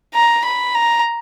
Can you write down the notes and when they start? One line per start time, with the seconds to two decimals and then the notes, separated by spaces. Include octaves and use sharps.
0.15 A#5
0.45 B5
0.75 A#5